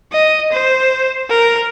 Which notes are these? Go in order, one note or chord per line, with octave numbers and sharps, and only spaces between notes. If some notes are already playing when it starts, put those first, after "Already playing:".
D#5
C5
A#4